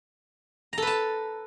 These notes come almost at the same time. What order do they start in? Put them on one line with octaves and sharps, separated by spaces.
A#5 A4 B4 A5